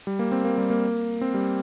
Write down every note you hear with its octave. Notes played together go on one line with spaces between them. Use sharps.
G3
A#3
C4
A#3
G3
A#3
C4
G3